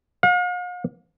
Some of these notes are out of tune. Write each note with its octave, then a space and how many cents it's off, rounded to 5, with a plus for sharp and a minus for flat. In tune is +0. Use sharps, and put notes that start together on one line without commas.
F5 +45